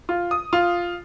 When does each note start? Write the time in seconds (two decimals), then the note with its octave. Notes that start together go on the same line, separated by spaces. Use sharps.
0.09 F4
0.31 D#6
0.53 F4